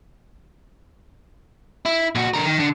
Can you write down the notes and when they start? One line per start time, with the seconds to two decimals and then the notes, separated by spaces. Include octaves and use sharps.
1.85 E4
2.15 A#2 F#4
2.34 D3 A#4
2.46 D#3
2.59 D3